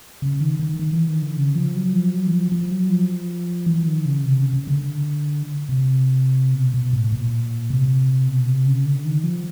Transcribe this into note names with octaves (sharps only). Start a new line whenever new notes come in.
C#3
D#3
D#3
D#3
E3
D#3
D3
C#3
F3
F#3
F3
F#3
E3
F3
F3
F#3
F3
E3
D#3
C#3
C3
C#3
C#3
D3
C3
B2
B2
A2
A#2
C3
B2
C3
C#3
D3
D#3
F3